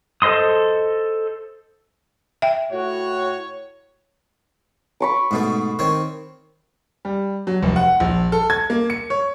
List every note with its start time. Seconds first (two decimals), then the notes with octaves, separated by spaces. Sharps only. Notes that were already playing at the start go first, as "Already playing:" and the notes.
0.22 A4 C5 D#5 C6 D#6
2.42 E5 G5
2.72 A2 F#4 C#5
5.00 B5 C#6 D6
5.31 G#2 B2 A3
5.79 D#3 C4 C#5
7.05 G3
7.47 F#3
7.63 F1
7.76 F#5
8.00 A#1
8.32 A4
8.50 G#6
8.70 A#3
8.90 C#7
9.10 C#5